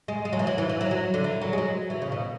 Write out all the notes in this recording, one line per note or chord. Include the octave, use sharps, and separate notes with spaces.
G#3
G#3
F#3
E3
F#3
E3
E3
F#3
F#3
D3
E3
F#3
G#3
F#3
E3
C#3
B2